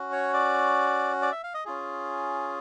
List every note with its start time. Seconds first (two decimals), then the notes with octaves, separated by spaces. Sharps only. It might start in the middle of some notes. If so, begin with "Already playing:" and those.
Already playing: C#4 F#4
0.12 C#5
0.34 D5
1.22 D5
1.32 E5
1.44 F5
1.54 D#5
1.65 C#4 F4 G#4